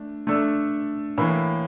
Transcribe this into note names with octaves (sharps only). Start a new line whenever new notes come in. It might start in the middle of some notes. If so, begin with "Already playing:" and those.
Already playing: A3 D4
A3 D4 A4
A2 E3 A#3